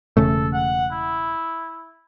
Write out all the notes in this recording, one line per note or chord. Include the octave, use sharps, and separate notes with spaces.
E1 C#3 A3 A4
F#5
E4